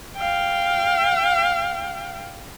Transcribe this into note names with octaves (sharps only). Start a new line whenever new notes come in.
F5 G5